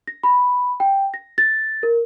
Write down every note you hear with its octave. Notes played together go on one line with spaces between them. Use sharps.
A#6
B5
G5
A#6
A6
A#4